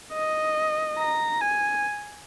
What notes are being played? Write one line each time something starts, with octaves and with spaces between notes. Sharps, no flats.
D#5
A#5
G#5